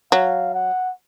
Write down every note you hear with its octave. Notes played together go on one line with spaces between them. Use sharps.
F#3 F5
F#5